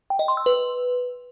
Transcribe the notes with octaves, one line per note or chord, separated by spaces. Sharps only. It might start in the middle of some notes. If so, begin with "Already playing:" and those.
G5
D#5
C6
E6
B4